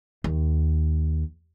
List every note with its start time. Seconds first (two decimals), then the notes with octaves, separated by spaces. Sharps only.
0.24 D#2